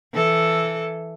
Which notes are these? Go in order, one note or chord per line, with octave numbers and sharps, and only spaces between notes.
E3 A4